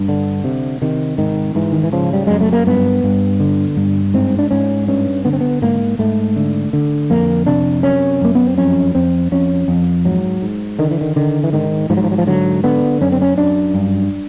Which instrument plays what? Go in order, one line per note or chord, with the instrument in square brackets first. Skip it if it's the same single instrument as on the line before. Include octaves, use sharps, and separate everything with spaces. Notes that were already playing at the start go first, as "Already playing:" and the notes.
Already playing: [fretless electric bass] G2
D3
C3
C3 D#3
G#2 D#3
G#2 E3
D#3
E3
C#3 F3
G3
F#2 G#3
A3
A#3
G2 B3
G2
D3
G2
G#2 C4
D4
G#2 C#4
G2 C#4
D3 B3
C4
B3
G#2 A#3
G#2 A3
D3
D3
F2 A#3
C3 D4
F#2 C#4
F#2 A#3
B3
C4
F2 C#4
F2 C4
F2 C#4
F2
G#2 F#3
G#2
D3 D#3
E3
D#3
D3 D#3
E3
G#2 D#3
G#2 F3
F#3
F3
F#3
F3
D3 F#3
D3 B3
F#2 C#4
C4
C#4
F#2 D4
G2